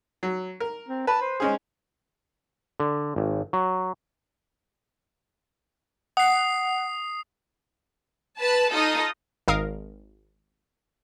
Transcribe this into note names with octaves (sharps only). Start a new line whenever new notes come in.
F#3
A#4
C4
B4 A5
C5
G#3 C#4 G#4
D3
G#1
F#3
F#5 D#6 C7
B4 A5
D#4 F4 A4 D#5 D#6
G#1 A#4 F5 D#6